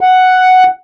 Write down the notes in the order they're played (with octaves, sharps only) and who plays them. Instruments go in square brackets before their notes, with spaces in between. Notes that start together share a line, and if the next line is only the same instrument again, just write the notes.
[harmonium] F#5